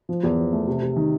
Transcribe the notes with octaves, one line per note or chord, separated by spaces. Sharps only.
F3
E2
F3
A3
C3
C3
D#3